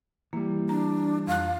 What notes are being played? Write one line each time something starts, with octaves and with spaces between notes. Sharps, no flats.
E3 G3 A#3
D4 A#5
F2 F5 F#6